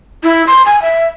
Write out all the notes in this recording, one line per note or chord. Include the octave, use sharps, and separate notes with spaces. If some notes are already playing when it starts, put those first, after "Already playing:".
E4
C6
G#5
E5